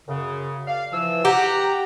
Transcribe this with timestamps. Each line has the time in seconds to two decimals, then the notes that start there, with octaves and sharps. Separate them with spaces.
0.08 F#2 C#3
0.68 D5 F5
0.92 E3 F3 E6
1.25 G4 F#5 A#5